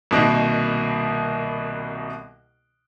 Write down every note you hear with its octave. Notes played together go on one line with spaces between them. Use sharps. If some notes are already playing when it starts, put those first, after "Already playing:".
C2 B2 D#3 A#3